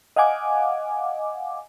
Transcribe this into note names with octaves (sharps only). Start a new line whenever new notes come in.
D#5 F5 F#5 G#5 D6